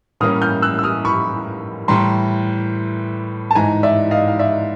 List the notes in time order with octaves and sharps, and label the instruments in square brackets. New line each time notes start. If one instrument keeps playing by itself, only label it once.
[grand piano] A2 E3 G3 A#3 C#4 [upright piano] D#6 F6
[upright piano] F6 G6
E6 F#6
E6
D#6 F6
B5 C#6
[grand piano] A2 E3 G3 [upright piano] A#5 C6
[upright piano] A5
[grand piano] G#2 E3 G#3 [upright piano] G#5 A#5
[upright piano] D5 E5
D#5 F5
F5
D5 E5